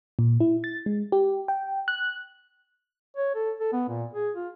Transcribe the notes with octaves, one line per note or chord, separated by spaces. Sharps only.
A#2
E4
A6
G#3
G4
G5
F#6
C#5
A4
A4
B3
A#2
G#4
F4